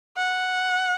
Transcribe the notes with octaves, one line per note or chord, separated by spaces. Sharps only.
F#5